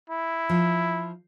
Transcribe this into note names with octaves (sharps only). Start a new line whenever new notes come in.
E4
F3